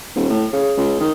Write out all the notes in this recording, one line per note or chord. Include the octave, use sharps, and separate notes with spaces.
D#1
A2
C#3
C#2
D#3